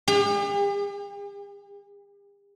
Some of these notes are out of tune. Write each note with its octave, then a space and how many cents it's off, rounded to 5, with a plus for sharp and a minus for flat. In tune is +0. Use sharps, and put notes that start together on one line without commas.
G4 +45